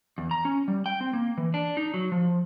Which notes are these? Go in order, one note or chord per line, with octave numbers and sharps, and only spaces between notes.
E2
A#5
C#4
G3
G5
C4
A#3
E3
D4
D#4
F#3
F3